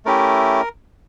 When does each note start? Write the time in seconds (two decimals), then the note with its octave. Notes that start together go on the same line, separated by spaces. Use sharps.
0.05 A3 C#4 E4 G4 A#4